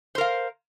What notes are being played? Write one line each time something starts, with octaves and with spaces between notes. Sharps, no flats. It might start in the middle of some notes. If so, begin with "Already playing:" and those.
A#4 C5 F5